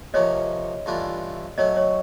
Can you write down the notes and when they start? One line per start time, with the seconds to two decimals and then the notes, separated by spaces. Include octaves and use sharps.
0.14 C3 F3 A#3 C#4 C#5 D#5
0.86 G2 E3 A3 D4 F4
1.58 F#3 A3 C#4 C#5 D#5
1.76 C#5 D#5